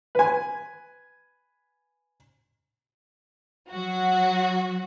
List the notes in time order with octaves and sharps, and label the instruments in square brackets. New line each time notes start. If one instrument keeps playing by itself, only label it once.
[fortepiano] B4 G#5
[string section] F#3 F#4